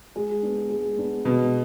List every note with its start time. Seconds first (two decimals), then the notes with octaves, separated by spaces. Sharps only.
0.16 G#3
0.42 B3 D4
0.69 G#3
0.97 B3 D4
1.25 B2 G#3